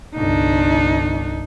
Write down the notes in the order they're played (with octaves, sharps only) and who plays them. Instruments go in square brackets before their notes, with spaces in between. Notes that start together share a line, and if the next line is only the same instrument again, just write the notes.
[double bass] G1 C2 [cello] D4 D#4